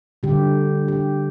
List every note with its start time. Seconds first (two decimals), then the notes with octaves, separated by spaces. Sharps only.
0.23 D3 G3 G4
0.88 G4